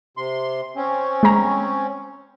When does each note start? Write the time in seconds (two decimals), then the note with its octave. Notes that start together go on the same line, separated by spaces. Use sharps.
0.17 C3 C6
0.76 C4 C#4
1.23 G#3 A#5